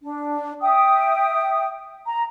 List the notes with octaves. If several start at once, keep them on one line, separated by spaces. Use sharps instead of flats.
D4
E5 G5 D#6
A#5